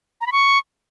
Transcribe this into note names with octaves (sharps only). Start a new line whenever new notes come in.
A#5
B5
C#6